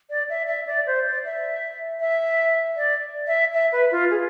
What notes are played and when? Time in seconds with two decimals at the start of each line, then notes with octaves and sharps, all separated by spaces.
0.10 D5
0.29 E5
0.47 E5
0.67 D5
0.87 C5
1.05 D5
1.25 E5
2.00 E5
2.77 D5
3.27 E5
3.53 E5
3.72 B4
3.91 F4
4.10 G#4